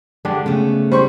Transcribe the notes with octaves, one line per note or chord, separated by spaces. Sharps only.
D3 G#3 D4 G4
C#3 A3 B3 C#4
G3 C5 C#6